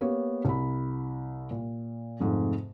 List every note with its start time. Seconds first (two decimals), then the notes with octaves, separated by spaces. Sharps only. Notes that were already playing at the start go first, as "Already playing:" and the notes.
0.01 A#3 B3 G4 C#5
0.45 C2 B5
1.51 A#2
2.20 F2 G#2 C3 A3